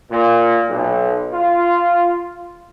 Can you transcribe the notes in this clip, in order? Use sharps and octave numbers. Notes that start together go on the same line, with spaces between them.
A#2
B1
F4